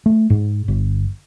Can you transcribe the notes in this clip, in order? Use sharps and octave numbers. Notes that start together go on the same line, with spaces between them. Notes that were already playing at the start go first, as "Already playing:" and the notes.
A3
G#2
G1